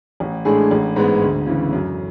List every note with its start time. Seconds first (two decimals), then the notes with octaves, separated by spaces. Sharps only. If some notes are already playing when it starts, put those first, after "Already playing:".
0.20 A1
0.45 A2 G#3 D4 G#4
0.71 A1
0.96 G#2 G#3 B3
1.22 D2
1.47 C#3 E3
1.72 F#2